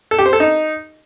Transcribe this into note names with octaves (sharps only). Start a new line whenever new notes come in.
A4
G4
C5
A4
D#4